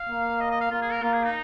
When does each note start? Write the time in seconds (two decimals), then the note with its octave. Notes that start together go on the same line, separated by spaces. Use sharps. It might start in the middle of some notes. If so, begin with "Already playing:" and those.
Already playing: F5
0.09 A#3
0.40 D#5
0.50 D#5
0.61 F5
0.71 A#3 F4
0.82 G#4
0.92 A#4
1.02 A#3 F4
1.13 G#4
1.24 D#4